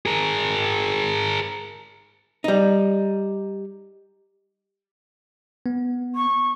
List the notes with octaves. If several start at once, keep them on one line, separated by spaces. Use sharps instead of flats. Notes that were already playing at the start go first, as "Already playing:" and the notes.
G#4 A#4
G3 D#4
B3
C#6